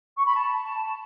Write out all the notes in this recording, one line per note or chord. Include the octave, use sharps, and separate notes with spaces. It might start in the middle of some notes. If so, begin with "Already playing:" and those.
C#6
B5
A5